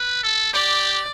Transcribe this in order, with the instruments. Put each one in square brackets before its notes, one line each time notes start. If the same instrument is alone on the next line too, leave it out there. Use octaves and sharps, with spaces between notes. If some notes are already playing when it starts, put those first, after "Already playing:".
Already playing: [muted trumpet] B4
A4
[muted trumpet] G4 [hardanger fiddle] D5